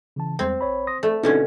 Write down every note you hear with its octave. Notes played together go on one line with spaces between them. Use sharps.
C#3 E3 A5
E2 G3 G#3 C4
A#1 C#5 B5
C6 D#6 A#6
A3 D5
B2 D3 C4 C#4 D#4 E4